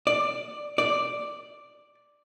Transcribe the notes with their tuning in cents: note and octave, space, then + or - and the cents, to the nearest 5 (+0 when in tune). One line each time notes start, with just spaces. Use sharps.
D5 +10
D5 +0